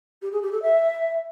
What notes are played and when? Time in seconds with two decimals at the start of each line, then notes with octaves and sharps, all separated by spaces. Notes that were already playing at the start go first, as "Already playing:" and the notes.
0.22 G4
0.32 G#4
0.42 G4
0.52 A4
0.62 E5